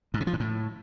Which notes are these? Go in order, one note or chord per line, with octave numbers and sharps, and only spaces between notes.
G#2
C3
F3
G#2
A2